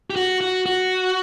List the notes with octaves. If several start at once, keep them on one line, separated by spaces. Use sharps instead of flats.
G4
F#4
F#4
F#4